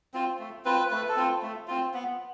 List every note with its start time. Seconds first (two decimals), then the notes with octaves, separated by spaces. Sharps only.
0.14 C4 F4
0.39 A3
0.65 C4 F4 B4
0.90 A3 B4
1.08 A4
1.16 C4 F4
1.42 A3
1.67 C4 F4
1.94 B3